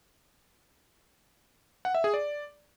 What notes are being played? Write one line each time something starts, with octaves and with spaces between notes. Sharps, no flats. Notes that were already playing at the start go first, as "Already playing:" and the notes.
F#5
E5
G#4
D5